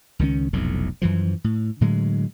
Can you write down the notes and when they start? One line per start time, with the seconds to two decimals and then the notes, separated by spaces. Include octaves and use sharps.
0.19 C#2 D#3 F#3 C#4
0.53 F1 B1 F2 A2
1.02 F#2 E3 F3
1.44 A2
1.81 A2 D3 F#3 G#3